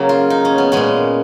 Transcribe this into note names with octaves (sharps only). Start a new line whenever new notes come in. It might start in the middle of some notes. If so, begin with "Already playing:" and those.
Already playing: C#3 F#3 A#3
F4
D#4
C#4
B3
A#2 G#3 B3 C#4